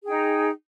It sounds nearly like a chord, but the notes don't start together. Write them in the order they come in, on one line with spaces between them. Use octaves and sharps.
G#4 G5 D#4